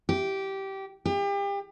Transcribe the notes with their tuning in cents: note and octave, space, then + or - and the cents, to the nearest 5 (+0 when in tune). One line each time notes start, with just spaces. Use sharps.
G4 -15
G4 +35